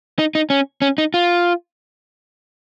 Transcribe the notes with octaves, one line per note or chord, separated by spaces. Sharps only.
D#4
D#4
C#4
C#4
D#4
F4